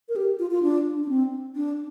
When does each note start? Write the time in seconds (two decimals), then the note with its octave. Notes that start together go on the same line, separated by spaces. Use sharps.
0.09 A#4
0.16 G4
0.39 F4
0.51 F4
0.63 D4
1.03 D4
1.09 C4
1.56 D4